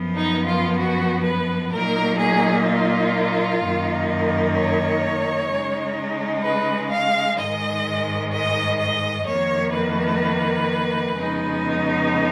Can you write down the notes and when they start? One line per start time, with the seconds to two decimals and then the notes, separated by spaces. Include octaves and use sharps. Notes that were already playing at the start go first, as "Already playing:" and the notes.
Already playing: F#2 F3 B3
0.15 D#4
0.47 F4
0.78 F#4
1.24 B4
1.71 A#2 F#3 A#3 D#4 A#4
2.18 G#4
2.65 F4
3.61 F#2 D#3 A#3 D#4
4.54 C#5
5.49 C#3 G#3 D#4
6.43 B4
6.90 F5
7.37 G#2 D#3 G#3 D#5
8.32 D#5
8.79 D#5
9.26 F2 D#3 A#3 C#5
9.73 B4
11.14 F2 C#3 G#3 B3 D#4